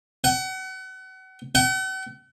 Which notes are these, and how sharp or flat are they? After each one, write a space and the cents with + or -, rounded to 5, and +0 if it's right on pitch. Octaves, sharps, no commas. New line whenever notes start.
F#5 +35
F#5 +45